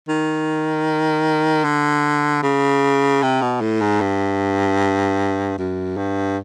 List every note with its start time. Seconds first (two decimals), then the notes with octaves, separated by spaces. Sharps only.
0.08 D#3
1.64 D3
2.43 C#3
3.23 C3
3.42 B2
3.61 A2
3.81 G#2
4.01 G2
5.58 F#2
5.97 G2